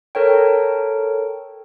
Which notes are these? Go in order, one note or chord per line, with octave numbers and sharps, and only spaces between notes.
A4 A#4 C#5 G5